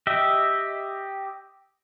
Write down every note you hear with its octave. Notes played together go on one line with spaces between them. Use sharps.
G4 D#5 E5